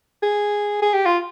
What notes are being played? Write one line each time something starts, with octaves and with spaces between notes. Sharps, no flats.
G#4
G#4
G4
F4